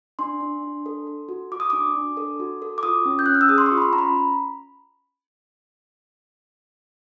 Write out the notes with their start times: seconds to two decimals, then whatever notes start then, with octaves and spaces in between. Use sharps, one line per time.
0.19 D4 C6
0.41 D4
0.63 D4
0.86 A4
1.07 A4
1.29 F#4
1.52 F#4 D6
1.60 D#6
1.70 D4 D6
1.95 D4
2.17 A4
2.40 F#4
2.62 A4
2.78 D6
2.83 F4 D#6
3.05 C#4
3.19 G6
3.26 C#4 F#6
3.35 F6
3.41 E6
3.49 G#4 D#6
3.58 C6
3.66 C#6
3.71 F4
3.78 B5
3.82 C6
3.92 C#4 A#5
3.98 B5